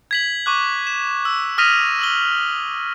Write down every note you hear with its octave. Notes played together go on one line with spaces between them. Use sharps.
G#6 B6 F#7
C#6 D6 F#6
E7
E6
D#6 F6 A#6 B6 D#7 F7
E6 F#7 G7